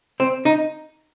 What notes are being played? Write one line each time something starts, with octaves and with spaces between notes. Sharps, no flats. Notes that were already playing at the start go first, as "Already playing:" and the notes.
C4
D#4